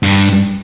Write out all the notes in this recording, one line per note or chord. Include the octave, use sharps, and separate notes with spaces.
G2